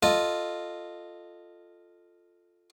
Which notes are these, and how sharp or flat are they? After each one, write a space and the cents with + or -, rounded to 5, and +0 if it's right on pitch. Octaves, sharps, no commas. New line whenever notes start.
F4 +0 A4 +0 D#5 -10